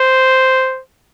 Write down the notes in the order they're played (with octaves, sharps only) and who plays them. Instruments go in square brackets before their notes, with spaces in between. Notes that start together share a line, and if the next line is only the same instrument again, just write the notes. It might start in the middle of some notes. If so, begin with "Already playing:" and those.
Already playing: [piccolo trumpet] C5